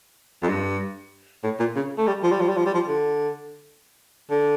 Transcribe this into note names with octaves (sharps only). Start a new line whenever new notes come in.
F2
G2
A2
A#2
C#3
A3
G3
F3
G3
F3
G3
F3
G3
F3
D3
D3